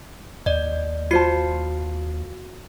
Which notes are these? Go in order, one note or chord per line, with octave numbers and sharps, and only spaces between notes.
D#2 D5 D#5
F4 F#4 C5 A5 C7 C#7